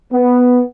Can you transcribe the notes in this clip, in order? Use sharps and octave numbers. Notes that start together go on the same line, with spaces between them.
B3